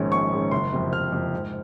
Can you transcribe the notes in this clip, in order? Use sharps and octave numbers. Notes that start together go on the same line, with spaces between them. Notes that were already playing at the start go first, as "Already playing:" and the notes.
Already playing: A#1 G#2 D#3 G#3 C#4
A#1 C#6
G#2 D#3 G#3 C#4
F#1 C6
F2 C3
F#1 F6
F2 C3
G#2